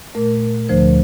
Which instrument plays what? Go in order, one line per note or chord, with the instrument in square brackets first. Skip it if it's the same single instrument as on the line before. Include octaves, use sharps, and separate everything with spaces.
[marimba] A#2 A3 A#4
D2 D3 F3 A3 C5